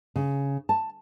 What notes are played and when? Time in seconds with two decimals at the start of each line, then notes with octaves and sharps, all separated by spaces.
0.16 C#3
0.69 A5